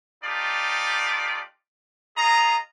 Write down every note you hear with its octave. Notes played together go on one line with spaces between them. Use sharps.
A3 D#4 F4 G4 D5
F4 G#4 D#5 A#5